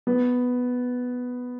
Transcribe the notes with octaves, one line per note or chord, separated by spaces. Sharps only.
B3